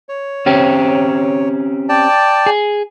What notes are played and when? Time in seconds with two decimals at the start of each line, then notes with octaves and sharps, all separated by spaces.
0.09 C#5
0.46 C4 C#4 G4
1.89 D5 G5 A5
2.46 G#4